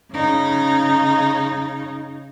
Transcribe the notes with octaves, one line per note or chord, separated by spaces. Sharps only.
C#3 D#4